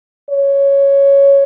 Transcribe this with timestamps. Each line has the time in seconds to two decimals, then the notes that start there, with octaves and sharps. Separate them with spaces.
0.30 C#5